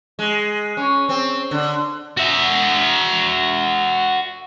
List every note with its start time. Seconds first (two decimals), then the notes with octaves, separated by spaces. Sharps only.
0.19 G#3
0.77 C#4
1.09 C4
1.51 D3
2.17 F#4 E5